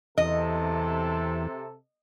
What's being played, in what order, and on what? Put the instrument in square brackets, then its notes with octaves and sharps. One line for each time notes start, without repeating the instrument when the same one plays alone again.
[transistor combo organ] E2 [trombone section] C3 A4 [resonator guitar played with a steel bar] D#5